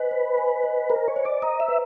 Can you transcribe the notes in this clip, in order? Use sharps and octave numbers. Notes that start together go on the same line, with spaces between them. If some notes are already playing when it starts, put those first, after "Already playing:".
Already playing: B4 C5 D#5 G#5
C5
G#5
D#5
A#4 C5
C#5
C5
D5
D#5 A#5
E5
B4